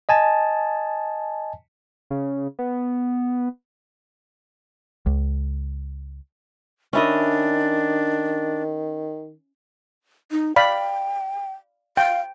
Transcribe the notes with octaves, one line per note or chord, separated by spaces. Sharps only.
D#5 G#5 A5
C#3
B3
C#2
D#3 C#4 D4 E4 D#5
D#4
D5 F5 G5 B5
F5 G5